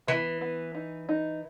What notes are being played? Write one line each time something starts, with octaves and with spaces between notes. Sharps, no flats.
E3 B3
B3
D#4
D#4